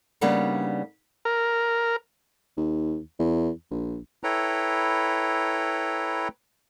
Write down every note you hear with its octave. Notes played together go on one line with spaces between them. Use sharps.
C#3 G3 A#3 B3 D4 D#4
A#4
D#2
E2
A#1
E4 A4 B4 C#5 G5 A#5